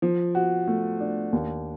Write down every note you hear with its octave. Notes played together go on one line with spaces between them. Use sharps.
F3
F#4
A3
D4
D#2